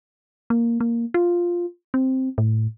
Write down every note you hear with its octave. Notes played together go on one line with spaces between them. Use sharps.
A#3
A#3
F4
C4
A2